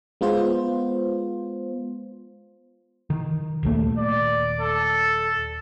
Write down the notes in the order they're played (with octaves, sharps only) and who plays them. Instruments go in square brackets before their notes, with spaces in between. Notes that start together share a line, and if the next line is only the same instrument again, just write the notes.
[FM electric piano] G#3 B3 F4 C5
[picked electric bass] D#3
D#1 D#2 A3
[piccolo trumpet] D5
A4